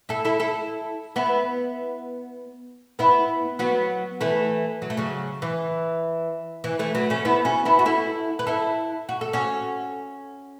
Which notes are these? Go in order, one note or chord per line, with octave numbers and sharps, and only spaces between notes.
E4 A4
E4 A4
E4 A4
B3 E4
B3 E4
F#3 B3
E3 A3
F#3
A3
C#3 F#3
E3
E3
E3 A3
F#3 B3
A3 C#4
B3 E4
C#4 F#4
B3 E4
F#4
E4 A4
B4
E4 A4
F#4
A4
C#4 F#4